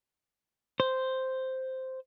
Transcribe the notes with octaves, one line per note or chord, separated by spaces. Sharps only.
C5